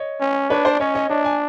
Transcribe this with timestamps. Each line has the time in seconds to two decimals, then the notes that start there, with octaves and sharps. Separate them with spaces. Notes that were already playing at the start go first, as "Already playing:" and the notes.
Already playing: C#5 D#5
0.21 C#4
0.50 D4 B4 C#5
0.65 C5 D5
0.80 C#4 C#5 D#5
0.95 C#5 D#5
1.09 D4 C#5 D#5
1.25 G#5